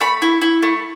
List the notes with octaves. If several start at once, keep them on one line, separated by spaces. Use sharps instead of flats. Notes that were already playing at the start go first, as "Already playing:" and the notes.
A3 B5
E4
E4
A3